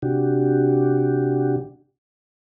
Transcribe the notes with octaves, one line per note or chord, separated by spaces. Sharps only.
C3 D4 F#4 G4